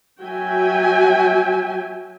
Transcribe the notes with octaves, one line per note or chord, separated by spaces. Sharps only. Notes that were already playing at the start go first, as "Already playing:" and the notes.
F#3 F#4 E5 G5 G#5